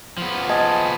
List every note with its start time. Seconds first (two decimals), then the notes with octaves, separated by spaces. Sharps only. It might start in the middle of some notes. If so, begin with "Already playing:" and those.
0.18 F3 B3
0.49 D#5 G#5 A5